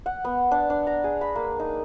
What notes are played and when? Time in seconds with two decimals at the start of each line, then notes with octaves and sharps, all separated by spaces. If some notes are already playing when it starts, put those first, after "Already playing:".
0.06 F#5
0.25 B3
0.51 D4
0.70 D4
0.87 A#5
1.04 G#4
1.21 B5
1.36 A#3
1.60 D#4